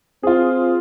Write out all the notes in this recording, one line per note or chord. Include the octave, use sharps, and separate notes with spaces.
C4 F4 G#4